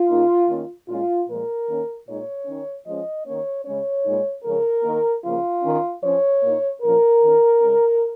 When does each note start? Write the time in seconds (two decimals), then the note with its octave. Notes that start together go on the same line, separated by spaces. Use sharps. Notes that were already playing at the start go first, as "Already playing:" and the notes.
Already playing: F4
0.09 C#3 A#3 D#4
0.48 D#3 A#3 C#4
0.87 A#2 G#3 C#4 F4
1.27 A#2 F3 G#3 A#4
1.67 D#3 A#3 C#4
2.06 A#2 G#3 D#4 C#5
2.45 D#3 C#4
2.85 F3 G#3 C#4 D#5
3.25 D#3 A#3 C#4 C#5
3.65 C#3 G#3 C#4 C#5
4.05 A#2 G#3 D#4
4.44 C#3 F3 G#3 C#4 A#4
4.83 D#3 A#3 D#4
5.23 C#3 F3 A#3 F4
5.63 D#3 C#4
6.02 F3 C#4 C#5
6.42 A#2 A#3 D#4
6.82 A#2 F3 C#4 A#4
7.21 D#3 C#4
7.60 C#3 G#3 C#4